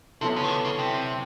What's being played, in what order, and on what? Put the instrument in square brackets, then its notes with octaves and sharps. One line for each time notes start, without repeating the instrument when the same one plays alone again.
[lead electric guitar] C3 [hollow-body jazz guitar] F#3 B3 E4 A4
[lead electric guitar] C#3
D#3
D3
C#3
C3